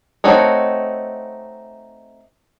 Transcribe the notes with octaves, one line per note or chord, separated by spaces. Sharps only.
A3 C4 D#4 F#4 C#5